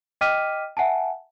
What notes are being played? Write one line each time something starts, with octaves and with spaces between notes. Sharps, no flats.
D#5 G5 D6 F6 B6 D#7
E5 F#5 G#5 A5